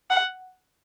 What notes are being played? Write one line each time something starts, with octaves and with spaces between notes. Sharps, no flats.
F#5